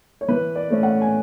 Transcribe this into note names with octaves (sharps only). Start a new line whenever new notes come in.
C#5
E3 B4
D5
A3 C#4
F#5
G#5